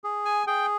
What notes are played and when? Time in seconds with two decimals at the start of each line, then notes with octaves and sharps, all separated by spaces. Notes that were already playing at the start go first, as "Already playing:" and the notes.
0.04 G#4
0.25 G#5
0.47 G#4 G5